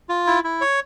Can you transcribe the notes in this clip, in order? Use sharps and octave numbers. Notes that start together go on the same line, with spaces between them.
F4
E4
E4
C#5